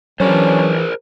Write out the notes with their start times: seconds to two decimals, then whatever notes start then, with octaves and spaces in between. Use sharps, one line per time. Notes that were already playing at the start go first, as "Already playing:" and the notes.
0.20 E3 F#3 C#4 D4 G#4 A#4 C5